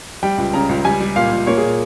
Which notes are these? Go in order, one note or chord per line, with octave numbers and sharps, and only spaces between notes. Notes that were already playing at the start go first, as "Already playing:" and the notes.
G3 G5
C#2
C#3 A#5
C#2
G3 G#5
G3
A#2 F5
A#2
A#3 C#5
G#4
A#2